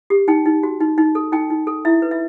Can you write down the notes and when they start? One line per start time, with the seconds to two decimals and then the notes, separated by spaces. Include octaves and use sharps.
0.10 G4
0.28 D#4 G5
0.46 D#4
0.63 F#4
0.80 D#4
0.98 D#4
1.15 A4
1.32 D#4 G5
1.50 D#4
1.67 A4
1.85 E4 E5
2.02 B4
2.11 E5